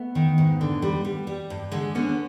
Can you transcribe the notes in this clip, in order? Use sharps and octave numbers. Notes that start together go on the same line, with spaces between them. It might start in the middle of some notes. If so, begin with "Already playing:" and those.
Already playing: A3 B3
D#3
G#2
D3
G3
G3
G3
G2
D3 G#3
D3 B3 C#4